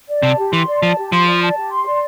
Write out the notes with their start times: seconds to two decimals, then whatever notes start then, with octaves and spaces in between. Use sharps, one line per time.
0.08 D5
0.23 C3 A5
0.38 G4
0.52 E3 C6
0.68 D5
0.82 F3 A5
0.98 G4
1.12 F3 C6
1.27 D5
1.42 A5
1.57 G4
1.72 C6
1.87 D5